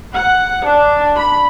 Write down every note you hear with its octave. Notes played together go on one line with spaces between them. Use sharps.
F#5
D4
B5